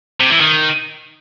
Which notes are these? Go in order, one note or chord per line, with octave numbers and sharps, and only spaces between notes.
C3
E3
D#3